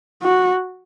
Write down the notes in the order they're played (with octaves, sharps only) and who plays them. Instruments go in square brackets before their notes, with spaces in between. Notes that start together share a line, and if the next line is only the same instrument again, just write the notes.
[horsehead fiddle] F#4